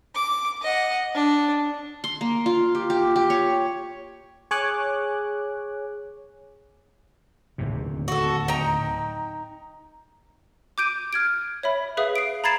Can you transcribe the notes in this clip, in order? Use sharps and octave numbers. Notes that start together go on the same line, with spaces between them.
D6
D#5 F#5
D4
C6
A#3
F4
G4
G4
G4
C#5
G#4 C#5 G#5 D6 F#6
D1 D#2 C3
F#4 A4
D#4 G5 A#5
D6 G6 D7 D#7
F6 G#6 D7
C#5 E5 B5
G#4 B4 E5 F5 D#6
C7 D7
A#5 B5 G#6 A6 C7 E7